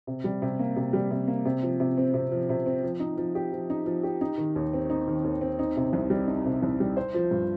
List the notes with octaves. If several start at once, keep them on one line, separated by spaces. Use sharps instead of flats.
C3
G3
C3
A#3
C3
G3
C3
A#3
C3
F3
C3
C4
C3
F3
C3
C4
F3
D#4
F3
G4
F3
D#4
F3
G4
D#4
D#3
D#2
C4
D#4
D#3
D#2
C4
D#4
C3
C2
G3
D#4
C3
C2
G3
C5
F3
G2